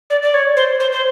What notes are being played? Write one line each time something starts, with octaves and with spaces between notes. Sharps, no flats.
D5
D5
C#5
C5
C5
C5